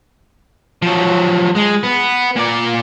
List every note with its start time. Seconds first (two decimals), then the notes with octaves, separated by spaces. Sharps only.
0.82 F3 F#3
1.56 G#3
1.83 B3
2.36 A#2 D5